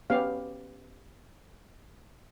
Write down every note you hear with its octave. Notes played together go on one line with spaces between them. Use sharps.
B3 C#4 G4 F5